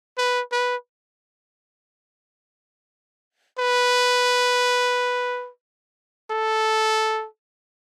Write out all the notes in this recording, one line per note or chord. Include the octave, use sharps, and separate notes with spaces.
B4
B4
B4
A4